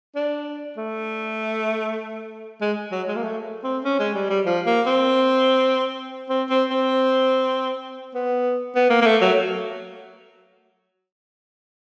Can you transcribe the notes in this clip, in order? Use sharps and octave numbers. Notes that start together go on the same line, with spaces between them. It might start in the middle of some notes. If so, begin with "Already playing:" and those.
D4
A3
G#3
F#3
G#3
A#3
A3
C4
C#4
G#3
G3
G3
F3
A#3
C4
C4
C4
C4
B3
B3
A#3
A#3
A3
F#3